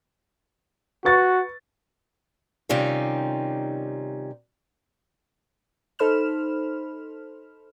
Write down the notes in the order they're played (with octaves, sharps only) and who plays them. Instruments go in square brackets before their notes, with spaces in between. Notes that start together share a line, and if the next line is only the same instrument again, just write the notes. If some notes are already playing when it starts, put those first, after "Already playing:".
[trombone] F#4 [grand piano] B4 C#6 A6
[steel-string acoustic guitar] C3 D#3 G3 C#4 D#4 F4
[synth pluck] D#4 A4 C5 B5 F6 E7